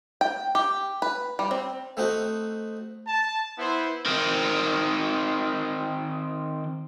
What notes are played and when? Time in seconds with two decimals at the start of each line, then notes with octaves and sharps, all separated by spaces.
0.21 G5
0.55 G4
1.02 B4
1.39 G3
1.51 C4
1.97 A3 C4 D#4 F#4
3.08 A5
3.59 B3 E4 C5
4.06 D#3 C4